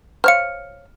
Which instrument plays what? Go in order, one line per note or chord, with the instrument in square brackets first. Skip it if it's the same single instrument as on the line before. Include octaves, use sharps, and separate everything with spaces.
[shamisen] C5 C#5 F5 [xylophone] F6 C#7